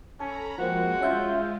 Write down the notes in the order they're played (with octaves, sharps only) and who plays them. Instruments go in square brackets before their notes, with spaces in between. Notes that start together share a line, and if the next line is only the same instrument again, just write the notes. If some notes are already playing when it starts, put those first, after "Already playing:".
[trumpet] C#4 [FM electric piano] A4 [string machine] A#5 B5
[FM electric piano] F3 A#3 C4 [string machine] G#3 [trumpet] F#4
[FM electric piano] C#4 E5 G6 [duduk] F4